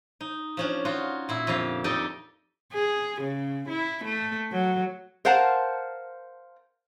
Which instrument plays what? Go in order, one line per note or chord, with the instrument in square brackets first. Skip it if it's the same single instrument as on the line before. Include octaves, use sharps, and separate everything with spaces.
[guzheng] D#4
F3 C#4 D4
D#4 F4 F#4
A#2 E4
F2 D3 G4 F5
D#4 G4 A4 D5 D#5
[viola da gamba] G#4
C#3
E4
A3
F#3
[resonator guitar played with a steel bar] A#4 C5 F5 F#5 A5